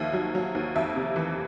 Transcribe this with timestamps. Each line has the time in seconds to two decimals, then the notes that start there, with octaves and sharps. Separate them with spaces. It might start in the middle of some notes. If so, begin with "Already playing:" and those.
Already playing: D#2 F3 E5
0.13 F#3
0.35 F#3
0.55 D#2
0.76 F2 E5
0.96 C3
1.16 E3